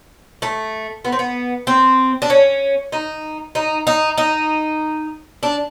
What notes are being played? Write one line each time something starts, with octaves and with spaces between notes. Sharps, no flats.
A3
B3
C4
B3
C4
D4
C#4
D#4
D#4
D#4
D#4
D4